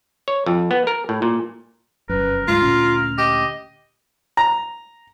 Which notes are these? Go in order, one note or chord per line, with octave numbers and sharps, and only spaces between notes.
C#5
F2
B3
A#4
A2
A#2
F1 F#2 A#4 B4
D2 G#2 G#3 F4 F6
D2 A#2 C#4
G4 D#5
A#5